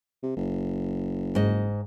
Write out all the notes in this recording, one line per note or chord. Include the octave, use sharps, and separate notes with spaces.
C3
F#1
G#2 D#5